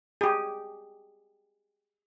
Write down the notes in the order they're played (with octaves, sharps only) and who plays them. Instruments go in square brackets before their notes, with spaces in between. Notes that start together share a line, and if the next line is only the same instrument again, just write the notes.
[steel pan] G4 G#4